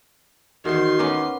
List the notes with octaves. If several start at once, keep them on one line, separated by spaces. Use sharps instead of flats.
E2 D#3 F#4 C5 C6
B3 C#4 A#4 D6